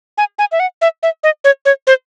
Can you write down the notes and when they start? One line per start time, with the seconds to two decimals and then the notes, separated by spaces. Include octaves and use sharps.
0.18 G#5
0.39 G#5
0.52 E5
0.60 F#5
0.82 E5
1.03 E5
1.23 D#5
1.44 C#5
1.65 C#5
1.87 C5